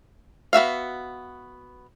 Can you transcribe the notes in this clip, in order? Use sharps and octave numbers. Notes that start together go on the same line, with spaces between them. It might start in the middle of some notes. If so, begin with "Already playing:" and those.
B3 F#4 E5 F5